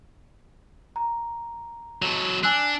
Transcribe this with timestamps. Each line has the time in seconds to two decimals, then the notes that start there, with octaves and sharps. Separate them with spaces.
0.96 A#5
2.02 F#3 A4
2.43 D4 G#5 E6 F#6